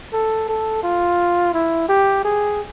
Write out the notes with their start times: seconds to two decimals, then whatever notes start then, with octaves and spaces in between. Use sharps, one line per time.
0.13 A4
0.49 A4
0.83 F4
1.54 E4
1.89 G4
2.24 G#4